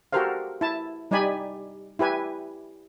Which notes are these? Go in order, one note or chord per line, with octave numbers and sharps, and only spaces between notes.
F#4 G4 A4 A#4 C5 F5
E4 A5
G3 D#4 G4 D5 G#5 B5
E4 G4 B4 G#5